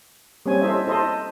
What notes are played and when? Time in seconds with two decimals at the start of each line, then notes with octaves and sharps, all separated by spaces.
0.46 G3 A#3 C4 C#4 G#5
0.61 E4 A4 C5 D#5 E5
0.87 E4 A4 C5 D#5 E5